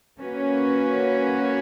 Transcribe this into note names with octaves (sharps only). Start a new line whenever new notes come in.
A#3 C#4 F#4 B4